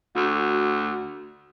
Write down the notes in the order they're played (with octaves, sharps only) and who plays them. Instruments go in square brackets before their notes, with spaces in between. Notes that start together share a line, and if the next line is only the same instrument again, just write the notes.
[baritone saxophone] D2 [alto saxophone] F#4